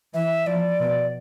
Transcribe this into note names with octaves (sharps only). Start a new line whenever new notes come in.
E3 E5
F3 D5
B2